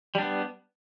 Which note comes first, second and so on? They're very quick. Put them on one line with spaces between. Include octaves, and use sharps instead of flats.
G3 D4 B3